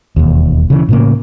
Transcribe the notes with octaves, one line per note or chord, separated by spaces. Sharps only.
E1 D#2
C#3 E3
A2 C#3 A#3